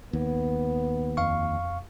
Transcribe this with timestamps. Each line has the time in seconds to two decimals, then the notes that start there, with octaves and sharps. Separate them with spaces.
0.13 D#2 B3
1.17 F2 F5 C#6